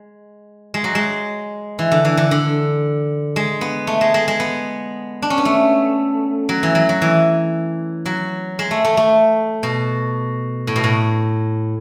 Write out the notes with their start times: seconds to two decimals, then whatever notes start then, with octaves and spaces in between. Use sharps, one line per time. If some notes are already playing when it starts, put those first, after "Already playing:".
Already playing: G#3
0.74 G#3
0.84 F#3
0.95 G#3
1.79 E3
1.92 D3
2.05 E3
2.17 D3
2.31 D3
3.36 G#3
3.61 B3
3.87 A3
4.01 G#3
4.14 G#3
4.28 G#3
4.40 B3
5.22 D4
5.30 C#4
5.38 B3
5.45 A3
6.49 F#3
6.63 E3
6.75 F#3
6.89 F#3
7.02 E3
8.06 F#3
8.59 G#3
8.71 A3
8.85 A3
8.97 A3
9.63 B2
10.67 A2
10.76 B2
10.84 A2